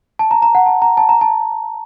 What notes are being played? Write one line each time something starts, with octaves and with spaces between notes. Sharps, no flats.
A5
A#5
A#5
F#5
A5
A#5
A5
A#5
A5